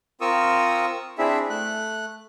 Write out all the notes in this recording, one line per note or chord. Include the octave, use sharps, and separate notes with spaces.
C4 F4 A#4 C#6 D#6 E6
C4 D4 E4 G#4 E5
A3 F#6